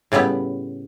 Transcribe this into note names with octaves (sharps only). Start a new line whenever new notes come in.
A2 C#3 G3 B3 E4